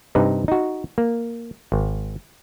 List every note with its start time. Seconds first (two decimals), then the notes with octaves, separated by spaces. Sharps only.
0.15 G2 C3 D#4 B4
0.48 D#4 F#4
0.98 A#3
1.72 G#1